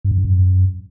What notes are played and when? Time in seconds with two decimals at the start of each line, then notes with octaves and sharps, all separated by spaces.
0.05 G2
0.11 F#2
0.18 G2
0.25 F#2